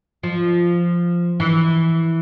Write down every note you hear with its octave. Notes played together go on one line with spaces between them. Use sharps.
F3
E3